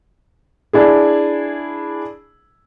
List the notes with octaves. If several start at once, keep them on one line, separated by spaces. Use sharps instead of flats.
D4 E4 G#4